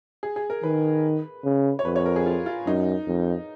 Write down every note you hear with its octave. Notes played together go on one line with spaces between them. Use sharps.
G#4
G#4
A#4
D#3 B4
C#3
C#5
F2 B4
C#5
A#4
G#4
F4
F4
F#2 D#4
F2